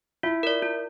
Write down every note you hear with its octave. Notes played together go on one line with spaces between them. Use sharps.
E4 F4
A#4 D5
F4